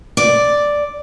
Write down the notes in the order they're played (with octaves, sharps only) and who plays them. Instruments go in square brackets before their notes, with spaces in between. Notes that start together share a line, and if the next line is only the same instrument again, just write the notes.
[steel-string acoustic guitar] D5